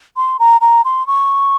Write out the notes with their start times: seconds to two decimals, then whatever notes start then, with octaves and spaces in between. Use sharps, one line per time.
0.17 C6
0.40 A#5
0.61 A#5
0.85 C6
1.07 C#6